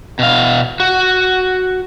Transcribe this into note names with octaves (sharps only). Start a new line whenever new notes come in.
B2 F5
F#4